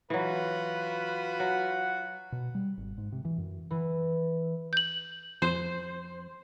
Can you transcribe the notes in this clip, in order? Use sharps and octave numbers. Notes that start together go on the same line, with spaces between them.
E3 F#3 F4 F#4 B4
F#3 F#5
B2
G3
G#1
G#2
C3
E3
F#2
E3
G6 F#7
F2 C5